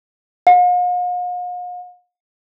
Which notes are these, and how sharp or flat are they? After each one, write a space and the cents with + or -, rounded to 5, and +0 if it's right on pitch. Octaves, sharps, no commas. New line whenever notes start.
F5 +45